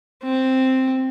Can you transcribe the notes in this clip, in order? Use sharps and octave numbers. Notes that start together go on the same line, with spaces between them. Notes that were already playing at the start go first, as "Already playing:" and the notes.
C4